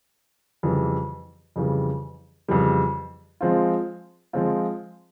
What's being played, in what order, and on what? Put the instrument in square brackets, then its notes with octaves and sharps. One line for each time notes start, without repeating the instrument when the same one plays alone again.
[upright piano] F2 C#3 E3 G3
F2 C#3 E3 G3
F2 C#3 E3 G3
F3 G#3 C4 F4
F3 G#3 C4 F4